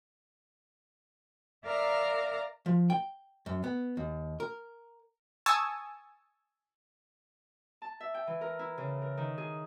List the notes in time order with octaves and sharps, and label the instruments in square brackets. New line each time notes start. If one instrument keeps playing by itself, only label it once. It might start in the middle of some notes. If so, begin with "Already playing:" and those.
[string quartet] A#4 D5 E5 F5 A#5 F6
[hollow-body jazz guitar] F3
G5
F#2
B3
D#2
A#4
[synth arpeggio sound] G#5 A5 C#6 D#6 E6
[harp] A5
E5
G5
E3
A#4
E4
C#3
A#4
D#3
G#4